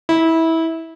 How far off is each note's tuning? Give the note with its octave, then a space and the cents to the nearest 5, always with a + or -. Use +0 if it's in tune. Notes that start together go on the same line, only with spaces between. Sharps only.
E4 -20